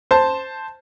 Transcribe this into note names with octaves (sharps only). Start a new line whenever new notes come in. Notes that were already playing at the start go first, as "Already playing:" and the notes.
C5 A5